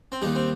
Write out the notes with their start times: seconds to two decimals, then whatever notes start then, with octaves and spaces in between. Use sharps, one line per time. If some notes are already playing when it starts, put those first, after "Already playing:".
0.12 C4
0.22 D#2 D#3 G3 D#4
0.35 C4